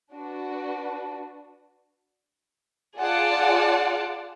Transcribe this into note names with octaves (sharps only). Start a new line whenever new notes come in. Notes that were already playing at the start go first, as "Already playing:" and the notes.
D4 F#4 B4
F4 G#4 D5 F#5 A5